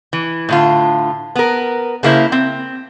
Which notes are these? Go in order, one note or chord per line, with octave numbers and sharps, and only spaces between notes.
E3
A2 D3 F4
B3 A#4
C#3 A#3 E4 C5
C4